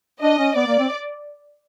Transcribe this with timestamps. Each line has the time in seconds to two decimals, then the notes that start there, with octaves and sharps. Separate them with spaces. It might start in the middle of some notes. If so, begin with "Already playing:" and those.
0.21 D4 D#5
0.38 C#4
0.56 B3 D5
0.67 A#3
0.79 C4